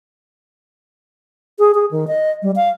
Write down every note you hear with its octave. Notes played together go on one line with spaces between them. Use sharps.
G#4
G#4
D#3
D#5
G3
F5